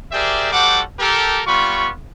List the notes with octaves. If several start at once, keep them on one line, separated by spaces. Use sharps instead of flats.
G4 G#4 A#4 C5 D5 E5
G3 F#4 A4 C5 F#5 D6
G4 A4 A#4
G3 B3 F4 B5 C#6